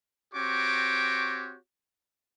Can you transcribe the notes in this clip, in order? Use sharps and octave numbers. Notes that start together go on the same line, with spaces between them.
C4 F#4 G4 C#5 C#6 D6